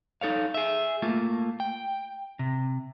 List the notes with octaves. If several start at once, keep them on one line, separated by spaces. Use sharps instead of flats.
D#4 A4 C#5 F5
G#4 E5
A3 A#3 F4
G5
C3